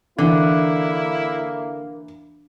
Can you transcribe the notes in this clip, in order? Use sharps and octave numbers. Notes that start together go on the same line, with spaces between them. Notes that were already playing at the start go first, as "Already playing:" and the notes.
D3 E3 A#3 E4